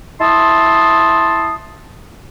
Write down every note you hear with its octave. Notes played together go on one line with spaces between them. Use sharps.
E4 A5 C6 D#6